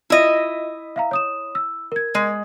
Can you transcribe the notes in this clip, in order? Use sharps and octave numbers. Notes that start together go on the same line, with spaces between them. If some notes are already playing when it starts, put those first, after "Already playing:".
E4 F4 D#5 E5
E5 F5 A#5
C#5 D#6 E7
E6
A#4 G#6
G#3